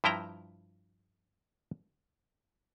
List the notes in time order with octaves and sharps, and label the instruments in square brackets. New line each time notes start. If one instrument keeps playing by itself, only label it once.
[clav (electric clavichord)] G2 F3 E4 G5 A#5